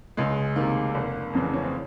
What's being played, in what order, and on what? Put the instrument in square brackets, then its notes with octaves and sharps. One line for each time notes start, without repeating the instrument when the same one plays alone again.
[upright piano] C#2 G#3
C3 D#3 A#3
F1
F2 C#3 E3
C#4
C4